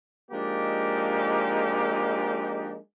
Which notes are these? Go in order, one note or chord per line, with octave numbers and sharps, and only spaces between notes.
F3 G#3 A#3 D4 D#4 G4